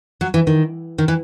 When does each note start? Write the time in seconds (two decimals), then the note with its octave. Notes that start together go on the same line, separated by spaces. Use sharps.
0.21 F#3
0.34 E3
0.47 D#3
0.98 D#3
1.08 E3